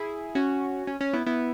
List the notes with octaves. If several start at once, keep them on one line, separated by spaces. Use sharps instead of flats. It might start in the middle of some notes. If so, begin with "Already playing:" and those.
Already playing: E4 G#4
C#4 F#4
C#4
C#4
B3 E4
B3 E4